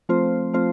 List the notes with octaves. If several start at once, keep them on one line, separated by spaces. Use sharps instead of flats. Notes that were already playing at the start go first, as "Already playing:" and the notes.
F3 A3 C4 F4 C5
F3 A3 C4 F4 C5